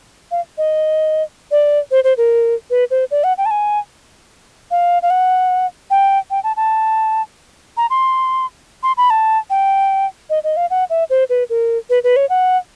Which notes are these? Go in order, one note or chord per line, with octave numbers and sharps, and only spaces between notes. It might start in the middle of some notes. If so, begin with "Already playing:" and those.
F5
D#5
D5
C5
C5
A#4
B4
C5
D5
F#5
G5
A5
G#5
F5
F5
F#5
G5
G5
A5
A5
A#5
C6
C6
B5
A5
G5
D#5
D#5
F5
F#5
E5
C5
B4
A#4
B4
B4
C#5
F#5